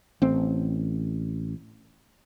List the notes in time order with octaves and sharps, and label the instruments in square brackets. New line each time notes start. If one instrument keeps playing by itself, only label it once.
[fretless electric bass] A1 C4